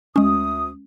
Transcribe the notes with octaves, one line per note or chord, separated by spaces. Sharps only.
D2 G#3 C#4 D#6